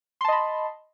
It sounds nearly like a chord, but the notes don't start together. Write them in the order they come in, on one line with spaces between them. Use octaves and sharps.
C6 A5 D#5 B5